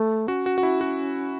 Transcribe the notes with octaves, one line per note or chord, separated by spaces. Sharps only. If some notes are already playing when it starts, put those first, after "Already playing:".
Already playing: A3
C#4 F#4
F#4
F#4
E4
F#4